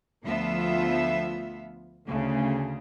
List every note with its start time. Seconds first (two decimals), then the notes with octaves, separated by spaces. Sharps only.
0.24 D2 F3 B3 F4 E5
2.05 D2 C#3